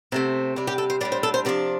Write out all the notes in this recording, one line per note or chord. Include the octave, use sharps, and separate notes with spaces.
C3 A3 C4
C3 G3 D4
G4
A4
C5
A2 G3 D4 D5
C5
A4
C5
C3 F3 D4 D5